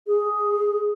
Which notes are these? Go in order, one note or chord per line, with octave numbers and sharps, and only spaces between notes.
G#4